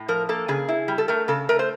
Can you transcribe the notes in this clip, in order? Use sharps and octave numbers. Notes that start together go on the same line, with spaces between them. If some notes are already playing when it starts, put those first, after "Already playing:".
Already playing: A2
F3 A#4
A#3 A4
C#3 G#4
E4
G3
A4
A3 A#4
C#3 A4
A3 A#4
C5